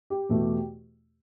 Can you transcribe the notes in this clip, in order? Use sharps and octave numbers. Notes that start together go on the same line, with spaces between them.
G4
E2 B2 A3